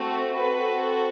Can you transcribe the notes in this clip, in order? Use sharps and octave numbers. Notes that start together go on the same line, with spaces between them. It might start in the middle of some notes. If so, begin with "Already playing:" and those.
Already playing: A3 C4 F#4
C4 F#4 A4 B4